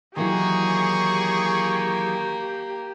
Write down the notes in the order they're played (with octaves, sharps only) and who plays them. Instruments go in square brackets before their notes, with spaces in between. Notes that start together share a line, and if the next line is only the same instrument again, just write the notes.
[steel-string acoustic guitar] D#3 E3 F#3 [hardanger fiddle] A#3 [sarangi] G4 [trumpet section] G#4 C#6